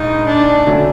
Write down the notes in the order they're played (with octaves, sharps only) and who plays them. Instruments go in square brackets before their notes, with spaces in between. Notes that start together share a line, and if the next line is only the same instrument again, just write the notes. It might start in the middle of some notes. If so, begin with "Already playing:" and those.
Already playing: [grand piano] A#1 G#2 [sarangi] D#4
[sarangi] D4
[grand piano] D3 F#3 A3 C#4